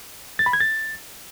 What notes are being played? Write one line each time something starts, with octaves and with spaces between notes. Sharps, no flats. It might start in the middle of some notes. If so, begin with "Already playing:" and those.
A6
B5
G#6
A6